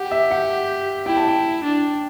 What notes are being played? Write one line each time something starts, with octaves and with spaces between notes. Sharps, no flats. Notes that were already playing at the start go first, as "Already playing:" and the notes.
Already playing: G4 F#5
E5
F#5
E4 G5
A5
G5
D4